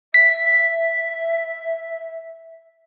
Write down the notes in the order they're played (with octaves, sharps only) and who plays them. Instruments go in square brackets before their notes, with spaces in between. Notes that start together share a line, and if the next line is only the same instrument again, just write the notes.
[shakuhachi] E5 [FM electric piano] B6